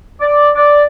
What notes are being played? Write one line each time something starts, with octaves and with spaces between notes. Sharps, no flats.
D5
D5